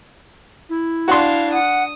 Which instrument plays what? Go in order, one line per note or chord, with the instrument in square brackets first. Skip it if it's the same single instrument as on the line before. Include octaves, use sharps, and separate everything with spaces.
[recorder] E4
[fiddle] D4 F5 [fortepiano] F#4 C6
[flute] F#5 [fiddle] D#6